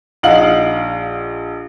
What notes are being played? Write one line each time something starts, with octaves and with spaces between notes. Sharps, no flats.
A#1 D#4 F5 F#5 F#7